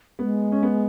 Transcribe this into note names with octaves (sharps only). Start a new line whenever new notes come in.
G#3 B3
C#4
B3